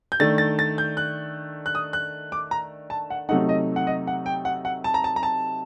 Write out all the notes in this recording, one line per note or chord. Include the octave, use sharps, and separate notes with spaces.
G6
D#3 A3 D4 A6
A6
A6
G6
F#6
F#6
D#6
F#6
D6
A#5
A5
F#5
C3 F#3 A3 D#4 F#5
D#5
F#5
D#5
F#5
G5
F#5
F#5
A5
A#5
A5
A#5
A5